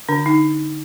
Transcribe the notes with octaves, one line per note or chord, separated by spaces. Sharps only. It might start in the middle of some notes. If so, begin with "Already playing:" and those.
D3 D4
D#4